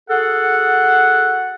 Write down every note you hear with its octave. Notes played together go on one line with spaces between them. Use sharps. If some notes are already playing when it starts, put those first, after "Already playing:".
F#4 G#4 A4 F#5